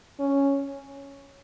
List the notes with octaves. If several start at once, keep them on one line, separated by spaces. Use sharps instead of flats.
C#4